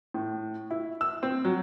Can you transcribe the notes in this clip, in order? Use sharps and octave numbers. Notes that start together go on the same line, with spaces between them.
A2
E4
E6
C4
F#3